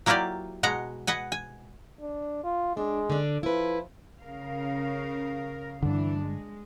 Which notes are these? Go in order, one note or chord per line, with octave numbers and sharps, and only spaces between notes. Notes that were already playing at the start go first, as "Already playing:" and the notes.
F#3 A#3 E4 F4 G4 D5
B2 G#3 F#5 A#5
B4 D#5 F#5 G#5
G#5
D4
F4
G#3 D4
D3 D4
F3 E4 B4
C#3 A#4 F5
G2 D3 E3 D4
G#3